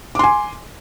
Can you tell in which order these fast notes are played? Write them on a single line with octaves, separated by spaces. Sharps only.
D6 C6 G#5